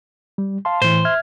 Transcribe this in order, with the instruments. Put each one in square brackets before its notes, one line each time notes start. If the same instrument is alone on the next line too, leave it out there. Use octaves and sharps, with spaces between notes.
[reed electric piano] G3
F5 A5 C6
[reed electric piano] A2 E3 [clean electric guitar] C5
[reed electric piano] E5 F6 G#6